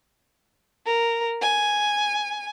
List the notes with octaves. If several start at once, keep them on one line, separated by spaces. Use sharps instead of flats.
A#4
G#5